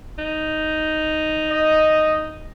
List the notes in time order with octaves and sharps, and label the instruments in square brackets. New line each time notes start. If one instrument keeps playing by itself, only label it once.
[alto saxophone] D#4
[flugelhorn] D#5